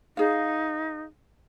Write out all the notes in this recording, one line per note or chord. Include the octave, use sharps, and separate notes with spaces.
D#4 G#4 F5